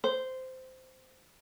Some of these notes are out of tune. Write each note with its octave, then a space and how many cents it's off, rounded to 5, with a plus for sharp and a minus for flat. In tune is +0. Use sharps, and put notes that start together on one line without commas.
C5 -15